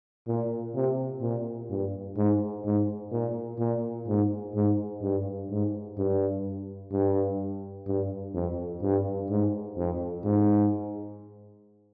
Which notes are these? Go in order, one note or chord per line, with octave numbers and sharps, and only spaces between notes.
A#2
C3
A#2
G2
G#2
G#2
A#2
A#2
G#2
G#2
G2
G#2
G2
G2
G2
F2
G2
G#2
F2
G#2